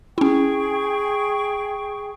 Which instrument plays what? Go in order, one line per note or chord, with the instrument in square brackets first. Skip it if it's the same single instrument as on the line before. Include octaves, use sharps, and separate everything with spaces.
[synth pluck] C#4 E4 [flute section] G#4 G5 C#6